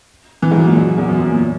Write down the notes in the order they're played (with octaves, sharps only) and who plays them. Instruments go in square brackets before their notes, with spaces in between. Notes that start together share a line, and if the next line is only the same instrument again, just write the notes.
[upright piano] E3
G#2
F#2
A#2
F#2
E2
F#2
F#2
A#2